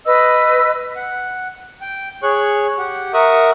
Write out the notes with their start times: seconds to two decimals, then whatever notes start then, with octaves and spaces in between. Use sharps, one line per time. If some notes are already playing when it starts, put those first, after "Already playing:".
0.06 B4 D#5 E6
0.96 F#5
1.81 G5
2.23 G#4 C#5 C#6 F#6
2.78 G4 F#5
3.14 A#4 E5 F#5 C#6 D#6